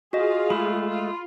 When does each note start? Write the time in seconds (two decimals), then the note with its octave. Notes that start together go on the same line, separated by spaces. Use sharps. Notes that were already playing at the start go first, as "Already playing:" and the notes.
0.13 F4 F#4 G#4 D#5 F5
0.50 G#3 A3 B5
0.89 F4